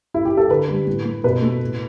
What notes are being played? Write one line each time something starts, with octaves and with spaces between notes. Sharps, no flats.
E4
G4
A4
D3 B4
G3
A2
A3
B2 B4
A3
A2